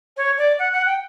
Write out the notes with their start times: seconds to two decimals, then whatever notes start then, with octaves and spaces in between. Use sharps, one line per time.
0.17 C#5
0.38 D5
0.59 F#5
0.72 F#5
0.86 G5